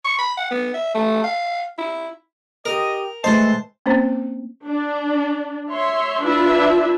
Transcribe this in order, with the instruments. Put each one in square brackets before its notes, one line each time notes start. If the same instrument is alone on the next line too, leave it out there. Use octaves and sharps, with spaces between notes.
[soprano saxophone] C#6
B5
F#5
B3
E5
A3
F5
E4
[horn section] G4 D#5 [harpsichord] A#4
[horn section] E3 A5 C6 [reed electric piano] G#3 A3 D#5 [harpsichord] C5
[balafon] A#3 C4 C#4 C5
[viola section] D4
C#5 E5 C6
D4 E4 F4 B4 E5